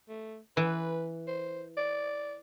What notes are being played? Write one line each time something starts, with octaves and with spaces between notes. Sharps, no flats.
A3
E3 B4
C5
D5